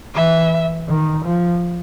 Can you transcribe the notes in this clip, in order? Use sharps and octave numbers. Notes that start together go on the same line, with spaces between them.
E3 E5
D#3
F3